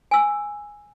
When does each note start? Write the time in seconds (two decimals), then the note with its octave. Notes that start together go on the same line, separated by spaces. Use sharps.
0.11 G#5 E6